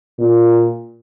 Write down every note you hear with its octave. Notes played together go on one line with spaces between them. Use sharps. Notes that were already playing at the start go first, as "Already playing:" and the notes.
A#2